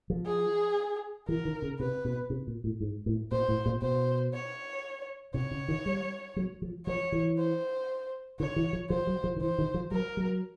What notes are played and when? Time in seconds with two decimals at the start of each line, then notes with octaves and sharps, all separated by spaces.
0.10 F3
0.26 G#4
1.28 E3 A#4
1.45 D#3
1.62 C#3
1.79 C3 B4
2.05 B2
2.30 C3
2.47 A#2
2.64 A2
2.80 G#2
3.06 A2
3.32 A#2 C5
3.48 A2
3.66 A#2
3.82 B2 C5
4.34 C#5
5.34 C3 C#5
5.51 C#3
5.68 D#3
5.86 G3
6.36 F#3
6.62 F3
6.86 F3 C#5
7.12 E3
7.38 C5
8.40 D3 C#5
8.56 E3
8.73 F3
8.90 F3 C5
9.07 F#3
9.24 F3
9.36 D#3
9.41 E3 C5
9.58 D#3
9.74 F3
9.91 F#3 A#4
10.17 F#3